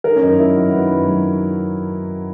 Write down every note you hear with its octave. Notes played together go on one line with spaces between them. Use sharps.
D#3 A#4
C#4
F#2 D#4
F#3 E4
F#2 F#4
D#3 B4
F#2 B4
F#3